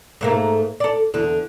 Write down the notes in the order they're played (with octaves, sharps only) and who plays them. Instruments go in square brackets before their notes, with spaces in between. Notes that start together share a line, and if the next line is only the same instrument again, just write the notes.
[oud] G#2 A3 A#3
A4 D5
E2 D3